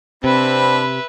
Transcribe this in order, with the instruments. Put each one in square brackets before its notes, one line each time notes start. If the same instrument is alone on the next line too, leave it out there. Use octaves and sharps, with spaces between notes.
[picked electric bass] C3 [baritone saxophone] C4 [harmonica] D4 B5 [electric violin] B4 E5